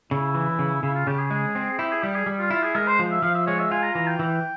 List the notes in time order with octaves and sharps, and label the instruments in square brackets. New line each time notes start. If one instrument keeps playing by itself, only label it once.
[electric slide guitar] C#3 [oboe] E4
[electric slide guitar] E3
C#3
[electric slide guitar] C#3 [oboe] E4
[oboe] F4
[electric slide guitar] C#3 [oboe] G4
[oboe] G#4
[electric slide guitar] G#3 [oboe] G#4
[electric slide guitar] C4
[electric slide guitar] E4 [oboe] G4
[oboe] G#4
[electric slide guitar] G3 [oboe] G4
[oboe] G#4
[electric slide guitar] G3
[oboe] F4
[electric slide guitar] E4 [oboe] F4
[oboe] G#4
[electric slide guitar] G#3 [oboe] A#4
[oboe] C5
[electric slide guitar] F3
[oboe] E5
[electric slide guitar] F3 [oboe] F5
[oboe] E5
[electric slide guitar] G#3 [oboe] C#5
[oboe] E5
[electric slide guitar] F4 [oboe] G#5
[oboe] A#5
[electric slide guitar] E3 [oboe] A#5
[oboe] G5
[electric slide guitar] E3